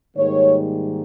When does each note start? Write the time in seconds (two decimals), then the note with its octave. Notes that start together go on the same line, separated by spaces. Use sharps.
0.16 G#2 D#3 G3 A#3 C#5